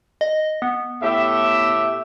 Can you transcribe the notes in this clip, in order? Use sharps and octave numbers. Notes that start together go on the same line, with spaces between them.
D#5
B3
A2 G4 E5